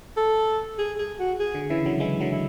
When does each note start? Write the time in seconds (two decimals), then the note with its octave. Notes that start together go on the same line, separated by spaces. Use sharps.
0.17 A4
0.78 G#4
0.98 G#4
1.19 F#4
1.40 G#4
1.55 D3
1.70 C#3 E3 E4
1.86 D3 F#3
2.00 E3 G#3 E4
2.21 D3 F#3
2.31 E4